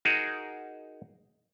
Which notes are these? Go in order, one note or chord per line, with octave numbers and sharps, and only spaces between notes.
D#4 F#4 G#4 A#4